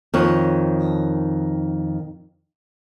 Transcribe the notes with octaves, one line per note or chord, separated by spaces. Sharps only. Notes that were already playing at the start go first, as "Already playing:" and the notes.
F2 D#3 C#5